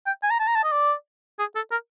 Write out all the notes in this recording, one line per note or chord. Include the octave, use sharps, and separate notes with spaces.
G5
G#5
A#5
A5
A#5
A5
D#5
D5
G#4
A4
A#4